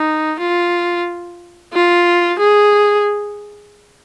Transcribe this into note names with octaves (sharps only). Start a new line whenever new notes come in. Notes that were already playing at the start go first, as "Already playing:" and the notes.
Already playing: D#4
F4
F4
G#4